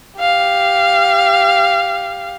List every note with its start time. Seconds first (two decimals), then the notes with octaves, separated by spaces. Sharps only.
0.20 G4 F5